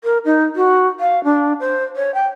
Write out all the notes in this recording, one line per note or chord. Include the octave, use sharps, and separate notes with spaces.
A#4
D#4
F#4
F5
D4
C5
C#5
G5